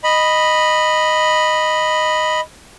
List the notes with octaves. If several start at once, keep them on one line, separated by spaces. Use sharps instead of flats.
D#5 B5